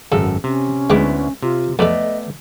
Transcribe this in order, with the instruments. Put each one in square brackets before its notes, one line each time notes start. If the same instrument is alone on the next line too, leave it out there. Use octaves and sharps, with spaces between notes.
[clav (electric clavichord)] G#1 F#2 A4 [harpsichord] C#3
[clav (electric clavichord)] C3 [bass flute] C#4
[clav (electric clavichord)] D2 B3 E4 [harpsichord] G#3 G5 D6
[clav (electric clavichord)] C3 [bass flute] F4
[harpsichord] F2 A4 [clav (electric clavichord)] A3 B3 D5 [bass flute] D#5